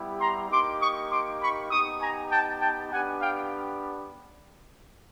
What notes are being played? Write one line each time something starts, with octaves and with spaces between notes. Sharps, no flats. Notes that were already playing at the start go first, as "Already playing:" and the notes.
Already playing: G3 B3 E4 G4
A#5 C6
A#3 D#4 G4 C6 D6
C#6 D#6
C6 D6
B5 C#6
B3 D#4 G4 C#6 D#6
G#5 A#5
G5 A5
G5 A5
B3 D4 G4 F#5 G#5
F5 G5